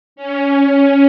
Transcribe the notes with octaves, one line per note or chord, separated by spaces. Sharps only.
C#4